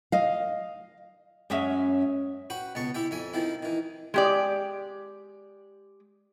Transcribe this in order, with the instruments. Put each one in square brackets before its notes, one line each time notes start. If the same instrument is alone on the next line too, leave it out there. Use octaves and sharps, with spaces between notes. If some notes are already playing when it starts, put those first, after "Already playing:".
[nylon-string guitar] D#5 F5
F#2 G#3 C#4 E5 F5
[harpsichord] F#4 B4 G5
C#2 B2 A5 C#6
E4 G4 E5 G5
F2 E5 G#5
D#3 F3 C4 E4
D#3 E3
[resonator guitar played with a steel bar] G#3 G4 D5